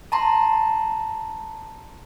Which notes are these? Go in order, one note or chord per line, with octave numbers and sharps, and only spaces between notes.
A5 A#5 C6